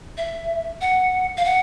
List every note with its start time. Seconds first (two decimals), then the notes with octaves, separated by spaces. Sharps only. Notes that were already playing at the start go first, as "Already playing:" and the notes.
0.17 E5
0.81 F#5
1.37 F5
1.45 F#5